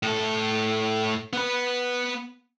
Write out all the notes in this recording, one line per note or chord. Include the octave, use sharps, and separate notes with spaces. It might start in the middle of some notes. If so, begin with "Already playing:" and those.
A2 A4
B3 B4